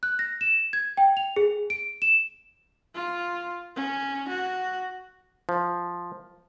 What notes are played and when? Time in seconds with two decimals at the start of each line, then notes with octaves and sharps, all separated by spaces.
0.03 F#6
0.19 A#6
0.41 E7
0.73 G#6
0.97 G5
1.17 F7
1.36 G#4
1.70 D7
2.02 E7
2.94 F4
3.76 C#4
4.29 F#4
5.49 F3